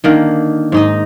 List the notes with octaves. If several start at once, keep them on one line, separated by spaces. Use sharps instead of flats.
D3 D#3 A#3
G#2 D#4 D#5